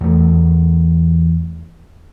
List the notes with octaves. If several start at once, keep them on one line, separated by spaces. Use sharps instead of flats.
E2 A3